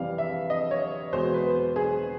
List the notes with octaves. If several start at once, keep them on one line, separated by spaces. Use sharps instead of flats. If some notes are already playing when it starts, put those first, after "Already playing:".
Already playing: F2 C3 E3 G3 F5
E5
D#5
C#5
E2 B2 G#3 C5
B4
G#4